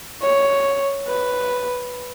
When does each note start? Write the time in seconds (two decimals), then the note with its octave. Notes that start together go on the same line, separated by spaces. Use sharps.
0.22 C#5
1.08 B4